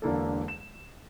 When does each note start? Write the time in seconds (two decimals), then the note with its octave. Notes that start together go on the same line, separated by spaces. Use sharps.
0.02 E1 D3 A#3 A4
0.48 E7